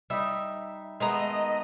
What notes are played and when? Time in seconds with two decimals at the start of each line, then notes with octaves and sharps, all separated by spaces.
0.10 G3 D#4 E5
1.00 D#3 G#3 A3 B3 D#5 A#5